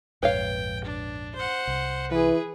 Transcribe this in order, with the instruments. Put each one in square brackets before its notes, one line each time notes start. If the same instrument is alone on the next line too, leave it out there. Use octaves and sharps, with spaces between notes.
[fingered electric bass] A#1 F2 G#2 [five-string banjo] B4 C#5 F5 [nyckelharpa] G5
[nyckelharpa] D4
C5 F#5
[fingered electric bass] C2
[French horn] E3 [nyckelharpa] G#4 B4